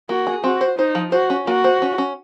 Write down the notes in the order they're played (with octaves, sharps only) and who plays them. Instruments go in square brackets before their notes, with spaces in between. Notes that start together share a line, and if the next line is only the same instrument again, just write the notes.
[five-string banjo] A#3 [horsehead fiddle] F#4
[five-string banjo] G#4
[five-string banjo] C4 [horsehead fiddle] F#4
[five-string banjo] C5
[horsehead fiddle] D#4 [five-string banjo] C5
[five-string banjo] F3
[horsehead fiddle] F#4 [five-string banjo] C5
[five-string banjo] C#4
[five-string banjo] A#3 [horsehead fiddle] F#4
[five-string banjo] C5
C#4
C#4